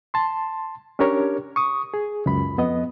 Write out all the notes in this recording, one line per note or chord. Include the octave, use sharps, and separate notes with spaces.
A5 C6
C#4 D4 G4 A#4 C#5
C#6 D#6
G#4
C#2 F#2 B5
F2 B3 D#5